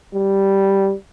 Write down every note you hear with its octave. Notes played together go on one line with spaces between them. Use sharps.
G3